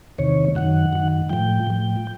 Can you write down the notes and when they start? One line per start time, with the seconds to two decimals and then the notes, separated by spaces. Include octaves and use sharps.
0.18 E2 C3 D#3 C#5
0.55 F#2 D#3 F#5
0.93 F#2 D#3
1.30 A2 F3 G5
1.67 A2 F3